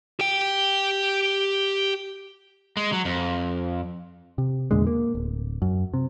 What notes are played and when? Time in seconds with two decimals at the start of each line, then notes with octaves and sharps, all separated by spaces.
0.20 G4 G5
2.77 G#3
2.92 F#3
3.05 F2
4.38 C3
4.71 E2 A#2 D3 G#3
4.87 A#3
5.15 D1
5.62 F#2
5.94 C3